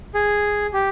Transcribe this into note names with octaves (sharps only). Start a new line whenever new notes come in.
G#4
G4